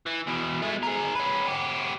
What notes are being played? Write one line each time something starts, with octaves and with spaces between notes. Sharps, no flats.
E3
E2 B2
G#3 A3
G#4 A#4
C#4 B4
B3 G4